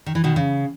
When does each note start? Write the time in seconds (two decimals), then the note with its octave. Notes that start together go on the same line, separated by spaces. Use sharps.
0.06 D#3
0.15 E3
0.24 B2 D#3
0.36 C#3